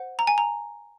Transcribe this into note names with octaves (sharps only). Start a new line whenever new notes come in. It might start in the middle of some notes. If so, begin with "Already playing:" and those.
Already playing: C5 F#5
A#5
G#5
A#5